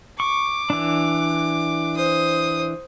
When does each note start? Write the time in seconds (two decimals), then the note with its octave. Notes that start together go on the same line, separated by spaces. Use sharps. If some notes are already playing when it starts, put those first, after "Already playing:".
0.20 C#6 D6
0.70 E3 D4
1.96 C5 D#6